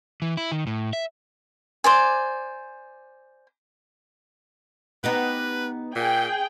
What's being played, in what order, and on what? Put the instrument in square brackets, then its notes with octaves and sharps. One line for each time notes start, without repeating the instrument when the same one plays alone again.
[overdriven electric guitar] E3
E4
D#3
A2
E5
[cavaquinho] C5 D5 G#5
[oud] B3 D#4 G4 [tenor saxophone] B4
[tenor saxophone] A#2 [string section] G#4 G5